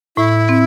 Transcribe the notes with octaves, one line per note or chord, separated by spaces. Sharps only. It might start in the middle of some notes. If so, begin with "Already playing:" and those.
A2 E4
C4